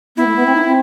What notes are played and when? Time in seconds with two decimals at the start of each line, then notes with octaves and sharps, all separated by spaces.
0.17 B3 E4
0.26 A3
0.36 B3
0.46 C4
0.55 D#4
0.65 C4